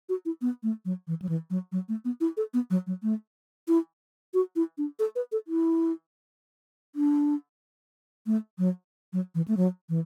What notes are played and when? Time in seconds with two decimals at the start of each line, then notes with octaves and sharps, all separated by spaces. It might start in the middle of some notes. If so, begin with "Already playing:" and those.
0.09 F#4
0.25 E4
0.42 B3
0.63 A3
0.85 F#3
1.07 E3
1.22 F#3
1.29 E3
1.50 F#3
1.72 F#3
1.89 A3
2.05 B3
2.21 E4
2.37 A4
2.54 B3
2.70 F#3
2.87 F#3
3.03 A3
3.68 E4
4.34 F#4
4.56 E4
4.78 D4
4.99 A4
5.16 B4
5.32 A4
5.48 E4
6.96 D4
8.26 A3
8.58 F#3
9.13 F#3
9.35 E3
9.48 A3
9.57 F#3
9.89 E3